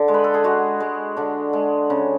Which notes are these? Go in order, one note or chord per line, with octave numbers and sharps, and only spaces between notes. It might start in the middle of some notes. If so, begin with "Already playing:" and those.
Already playing: D3
G#3
B4
A4
G#4
G#3 F#4
G#3
D3 D4
G#3
C#3